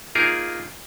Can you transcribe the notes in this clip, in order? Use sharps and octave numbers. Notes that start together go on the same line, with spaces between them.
A#3 D#4 F4 G#4 A#4